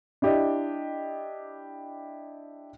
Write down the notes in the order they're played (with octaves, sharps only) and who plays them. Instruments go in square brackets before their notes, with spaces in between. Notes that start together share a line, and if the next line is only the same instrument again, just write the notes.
[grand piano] D4 E4 G4 D5 D#5